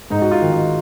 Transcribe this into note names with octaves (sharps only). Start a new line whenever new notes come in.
G#2 D#4
F#4
F4
D#3
D#4